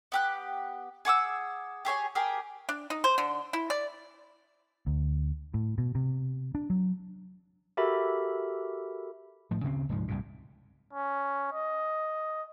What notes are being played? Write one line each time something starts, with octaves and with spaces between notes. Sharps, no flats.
B3 G4 F#6
G#4 F#5 D6 E6
G4 G#4 C#5 G#5
G4 G#4 A#4
D4
D#4
C5
D3
E4
D5
D2
A2
B2
C3
D4
F#3
F#4 G4 A4 A#4 E5 B5
A2 F3
D2 C#3 G3 C4
F1 D2 G#2 F3
C2 G2 A#2
C#4
D#5